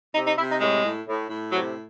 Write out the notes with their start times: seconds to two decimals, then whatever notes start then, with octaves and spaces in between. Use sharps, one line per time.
0.14 C3 D#4
0.27 D#4
0.38 C3 E4
0.49 D#4
0.61 A2 G#3
0.84 A2
1.07 A2
1.29 A2
1.52 C3 F#3